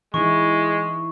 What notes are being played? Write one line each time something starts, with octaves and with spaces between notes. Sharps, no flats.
E3 G#3 D#4 E4 C#6